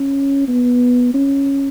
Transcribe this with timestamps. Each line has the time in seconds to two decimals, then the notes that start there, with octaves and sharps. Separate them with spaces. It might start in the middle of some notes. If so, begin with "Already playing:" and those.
Already playing: C#4
0.48 B3
1.14 C#4